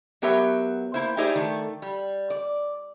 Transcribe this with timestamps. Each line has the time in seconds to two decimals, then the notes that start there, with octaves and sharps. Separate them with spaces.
0.22 F#3 B3 G4 A#4 C#5 E5
0.94 A#3 E4 C5
1.17 D#4 E4 G4 G#4 C5 D5
1.35 D#3 A3
1.82 G3
2.30 D5